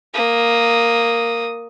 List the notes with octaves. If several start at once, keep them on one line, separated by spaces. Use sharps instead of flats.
A#3 D#6